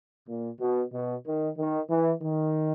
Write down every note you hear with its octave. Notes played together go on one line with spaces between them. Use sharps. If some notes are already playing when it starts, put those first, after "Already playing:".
A#2
B2
B2
D#3
D#3
E3
D#3